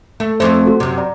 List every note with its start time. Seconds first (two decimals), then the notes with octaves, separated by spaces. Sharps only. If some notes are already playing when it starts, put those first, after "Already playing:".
0.20 A3
0.40 F2 A3 C5
0.67 F#4
0.80 F#2 C3
0.98 D5 A#5